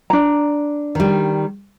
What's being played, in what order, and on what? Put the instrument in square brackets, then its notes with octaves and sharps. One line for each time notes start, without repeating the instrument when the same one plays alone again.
[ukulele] D4 A#5
[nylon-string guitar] D#3 G3